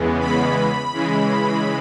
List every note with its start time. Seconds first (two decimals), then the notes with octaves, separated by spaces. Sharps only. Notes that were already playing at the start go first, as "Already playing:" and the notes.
Already playing: E2 C#3 E3 G#3 B3
0.21 B5
0.93 C#3 E3 G#3